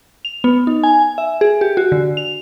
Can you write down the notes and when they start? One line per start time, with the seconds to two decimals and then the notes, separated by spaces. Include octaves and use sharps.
0.25 F7
0.44 B3
0.67 D#4
0.83 G#5
1.18 E5
1.41 G#4
1.61 G4
1.77 F#4
1.92 D3
2.17 F7